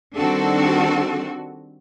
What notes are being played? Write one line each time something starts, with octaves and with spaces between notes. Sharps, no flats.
D#3 G3 C4 D4 F#4 A4